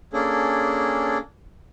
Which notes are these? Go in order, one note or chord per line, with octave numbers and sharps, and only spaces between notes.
A#3 C#4 D4 G#4 A4